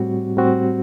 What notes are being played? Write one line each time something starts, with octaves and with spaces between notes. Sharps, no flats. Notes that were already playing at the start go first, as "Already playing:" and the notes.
Already playing: A2 G3 C4 F#4
A2 G3 C4 F#4